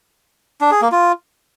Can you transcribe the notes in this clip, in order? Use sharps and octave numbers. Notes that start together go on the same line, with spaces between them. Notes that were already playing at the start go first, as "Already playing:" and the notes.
D4
G#4
A#3
F4